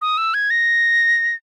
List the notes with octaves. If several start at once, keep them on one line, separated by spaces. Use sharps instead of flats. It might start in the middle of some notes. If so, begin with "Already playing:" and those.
D#6
E6
G#6
A#6